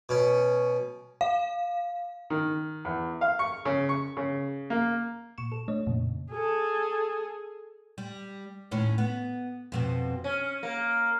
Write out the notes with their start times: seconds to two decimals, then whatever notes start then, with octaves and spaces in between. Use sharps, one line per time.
0.09 B2 C#4
1.21 F5
2.30 D#3
2.85 E2
3.21 F5
3.39 C#6
3.65 C#3
3.89 C#6
4.17 C#3
4.70 A#3
5.38 A#2 C#6 E7
5.52 A4
5.68 A3 D4 C#5 D#5
5.87 F2 A#2 C#3
6.30 G#4 A4
7.98 G3
8.71 D#2 A2 C#4
8.98 B3
9.72 F2 B2 C4
10.24 C#4
10.63 A#3